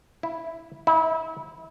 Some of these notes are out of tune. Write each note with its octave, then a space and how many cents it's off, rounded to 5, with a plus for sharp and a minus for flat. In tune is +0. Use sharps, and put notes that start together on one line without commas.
E4 -5
E4 -35